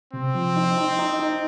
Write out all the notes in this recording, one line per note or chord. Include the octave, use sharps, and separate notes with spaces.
C3 C4
F3
D#4
D#4
D#4
D#4